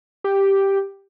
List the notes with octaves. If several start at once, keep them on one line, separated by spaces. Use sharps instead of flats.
G4